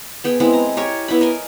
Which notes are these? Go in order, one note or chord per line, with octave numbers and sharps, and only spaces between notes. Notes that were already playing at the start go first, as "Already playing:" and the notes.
B3 G#4 G5
G#3 B3 C4 E4
A#5
G4 A#4 C#5 G#5
B3 E4 G5 B5
A#4 D#5 G#5